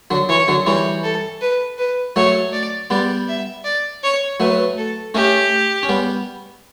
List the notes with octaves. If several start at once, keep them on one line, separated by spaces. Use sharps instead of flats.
D3 F#3
E3 C#5
D3 F#3
E3 G3 C#5
A4
B4
B4
F#3 A3 C#5
D5
G3 B3 D5
E5
D5
C#5
F#3 A3 B4
A4
A3 C#4 G4
C#4
G3 B3